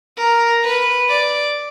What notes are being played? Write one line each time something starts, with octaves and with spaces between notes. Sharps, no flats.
A#4
B4
D5